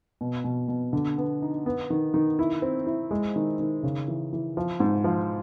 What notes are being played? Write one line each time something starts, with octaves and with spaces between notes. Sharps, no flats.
B2
B2
B2
D3
B3
D#4
B3
D#3
D#3
E4
C4
E4
G#3
D#3
D#3
C#3
E3
E3
F3
G#2
F3